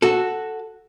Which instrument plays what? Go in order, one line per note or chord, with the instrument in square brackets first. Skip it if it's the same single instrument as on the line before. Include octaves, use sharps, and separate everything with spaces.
[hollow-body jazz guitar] F#4 A4